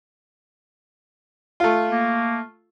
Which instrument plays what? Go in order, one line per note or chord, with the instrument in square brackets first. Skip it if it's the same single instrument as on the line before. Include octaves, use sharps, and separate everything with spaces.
[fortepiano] A3 F4
[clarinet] A#3